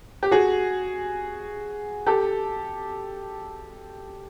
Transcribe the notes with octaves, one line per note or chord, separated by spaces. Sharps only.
G4
F#4 G#4
G4 A4